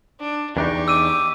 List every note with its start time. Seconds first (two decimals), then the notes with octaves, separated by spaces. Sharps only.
0.20 D4
0.57 E2 D4 D#4 G4 C#6
0.88 D6 E6 D#7